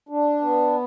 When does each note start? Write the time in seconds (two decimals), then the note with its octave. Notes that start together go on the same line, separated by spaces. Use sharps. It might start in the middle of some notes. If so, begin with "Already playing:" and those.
0.09 D4
0.41 B3